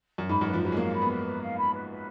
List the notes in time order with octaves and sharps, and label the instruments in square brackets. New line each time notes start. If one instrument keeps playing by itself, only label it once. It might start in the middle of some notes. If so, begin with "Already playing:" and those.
[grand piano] F#2
[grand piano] G#2 [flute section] B5
[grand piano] F#2 [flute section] B4
[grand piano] F3
[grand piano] F#3 [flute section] B4
[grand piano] G#3
[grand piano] A#3 [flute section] F5
[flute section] B5
[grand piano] B3
[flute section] B4
B4
F5
B5
B4
B4